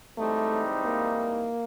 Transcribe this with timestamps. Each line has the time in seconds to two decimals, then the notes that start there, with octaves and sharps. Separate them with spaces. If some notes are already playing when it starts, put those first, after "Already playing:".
0.18 G#2 E3 G3 A3 C4 D#4
0.85 A#3